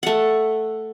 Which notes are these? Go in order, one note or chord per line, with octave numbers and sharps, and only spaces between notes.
A3 F#5